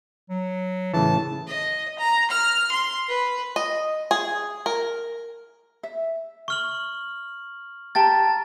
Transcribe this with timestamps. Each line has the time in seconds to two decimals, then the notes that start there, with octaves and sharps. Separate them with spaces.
0.30 F#3
0.94 A2 C#3 E3 A5
1.47 D#5
1.99 A#5
2.31 F6
2.72 C6
3.09 B4
3.56 D#5
4.11 G#4
4.66 A#4
5.83 E5
6.48 C#6 F6 F#7
7.95 G4 G5 A5 A#5 A6